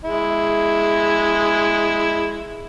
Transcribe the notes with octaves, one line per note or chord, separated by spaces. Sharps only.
G#3 E4